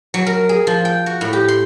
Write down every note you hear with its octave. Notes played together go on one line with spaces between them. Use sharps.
F#3
A#4
G#4
F3
G5
F#4
A2
G4
C6